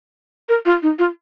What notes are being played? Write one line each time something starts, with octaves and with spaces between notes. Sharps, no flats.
A#4
F4
D#4
F4